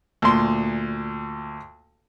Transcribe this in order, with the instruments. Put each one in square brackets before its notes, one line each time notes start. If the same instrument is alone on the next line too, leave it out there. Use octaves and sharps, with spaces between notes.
[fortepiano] D2 A#2 C6